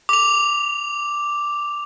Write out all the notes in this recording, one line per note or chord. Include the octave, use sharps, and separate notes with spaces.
D6 F7